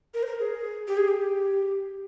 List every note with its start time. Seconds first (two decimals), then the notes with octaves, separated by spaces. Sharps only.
0.14 A#4
0.23 C5
0.26 A#4
0.39 G#4
0.88 G4
0.97 G#4
1.08 G4